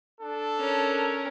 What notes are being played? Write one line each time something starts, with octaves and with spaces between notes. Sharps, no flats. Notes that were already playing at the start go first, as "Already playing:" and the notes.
D4 A4
C#4 A#4